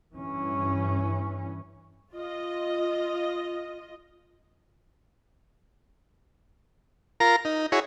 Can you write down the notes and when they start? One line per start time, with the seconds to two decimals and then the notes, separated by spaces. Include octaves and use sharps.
0.14 G2 E3 C#4
2.13 F4 D#5
7.20 F4 A#4 A#5
7.45 D#4
7.72 E4 F#4 G#4 C#5